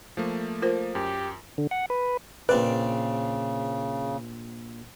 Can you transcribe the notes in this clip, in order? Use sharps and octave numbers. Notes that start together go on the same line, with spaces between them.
F3 A3 A#3
F4 A#4 C5
F#2 G4
D3
F#5
B4
A#1 C#3 C4 B4 D5